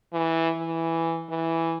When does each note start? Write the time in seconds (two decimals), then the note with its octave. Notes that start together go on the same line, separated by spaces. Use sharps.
0.13 E3
0.57 E3
1.29 E3